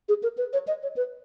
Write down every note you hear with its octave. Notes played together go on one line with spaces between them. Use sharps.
G#4
A#4
B4
C#5
D#5
C#5
B4